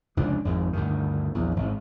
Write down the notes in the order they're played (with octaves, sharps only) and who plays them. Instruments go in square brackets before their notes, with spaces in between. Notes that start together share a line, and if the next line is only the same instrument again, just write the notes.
[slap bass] F1 C#2 A#2 D4
G#1 F2 G#2
D2 G2 D#3
A#1 E2
G#1